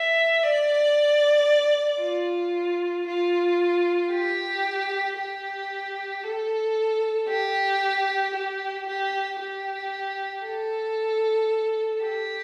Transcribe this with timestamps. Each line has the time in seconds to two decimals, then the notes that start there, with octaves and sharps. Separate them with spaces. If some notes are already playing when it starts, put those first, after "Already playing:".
Already playing: E5
0.43 D5
2.01 F4
3.07 F4
4.12 G4
5.18 G4
6.24 A4
7.29 G4
8.34 G4
8.86 G4
9.39 G4
10.45 A4
12.03 G4